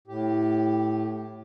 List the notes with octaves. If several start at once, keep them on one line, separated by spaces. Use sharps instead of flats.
A2 G4